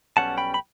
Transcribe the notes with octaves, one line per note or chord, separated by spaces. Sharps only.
B1 B2 G3 C#4 F#5 A5
G5 B5
B5